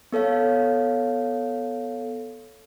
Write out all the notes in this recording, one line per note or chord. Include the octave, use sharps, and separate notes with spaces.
B3 A4 C#5 F5